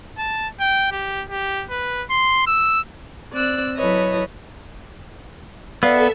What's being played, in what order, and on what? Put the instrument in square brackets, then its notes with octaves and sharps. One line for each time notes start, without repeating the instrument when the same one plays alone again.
[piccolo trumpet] A5
G5
G4
G4
B4
C6
E6
[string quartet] C4 D5 E6 F#6
F#3 E4 A4 B4 C#5 D#5
[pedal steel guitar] B3 [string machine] A4 E5 [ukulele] D5 F5